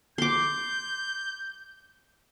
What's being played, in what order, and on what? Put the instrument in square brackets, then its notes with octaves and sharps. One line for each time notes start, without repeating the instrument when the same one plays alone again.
[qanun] C6 D6 [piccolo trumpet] G6